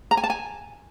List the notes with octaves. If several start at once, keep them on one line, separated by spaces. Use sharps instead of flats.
A#5
G#5
A5
G#5